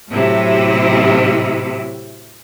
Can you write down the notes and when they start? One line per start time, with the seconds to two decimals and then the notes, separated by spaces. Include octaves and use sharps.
0.10 A2 C3 F#3 E4